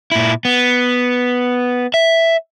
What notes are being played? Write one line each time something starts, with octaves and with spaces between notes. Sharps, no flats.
A#2 E4
B3
E5